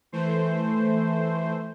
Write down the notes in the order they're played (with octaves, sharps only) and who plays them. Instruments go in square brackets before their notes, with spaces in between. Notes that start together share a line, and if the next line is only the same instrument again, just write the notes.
[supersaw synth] E3 A3 C5